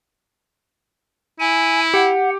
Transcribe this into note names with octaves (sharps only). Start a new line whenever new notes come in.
E4 G#5
G4 F#5